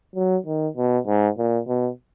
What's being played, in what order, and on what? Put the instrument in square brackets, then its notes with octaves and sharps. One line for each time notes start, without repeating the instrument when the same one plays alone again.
[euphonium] F#3
D#3
B2
G#2
A#2
B2